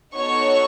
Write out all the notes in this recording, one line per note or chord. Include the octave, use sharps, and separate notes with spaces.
B3 D#4 F#4 A4 C#5 C#6